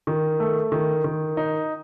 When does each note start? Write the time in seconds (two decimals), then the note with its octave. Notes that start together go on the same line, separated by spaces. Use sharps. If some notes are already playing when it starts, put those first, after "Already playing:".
0.07 D#3
0.40 A3
0.72 D#3
1.04 D#3
1.37 D#4